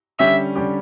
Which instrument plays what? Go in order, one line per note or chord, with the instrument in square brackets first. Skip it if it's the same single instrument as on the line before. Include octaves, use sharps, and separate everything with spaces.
[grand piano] D3 G3 C#4 G4 [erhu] E5
[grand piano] D3 G3 C#4 G4